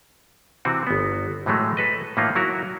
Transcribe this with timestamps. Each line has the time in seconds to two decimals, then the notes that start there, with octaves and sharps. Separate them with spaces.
0.65 C3 E3 C4 F#4
0.87 G1 B3
1.46 A2 E3 F#3 G#3 A3
1.77 A4 B4 D#5
2.17 A2 E3 A#3 D#4 F4
2.35 F#3 E4 F#4 A#4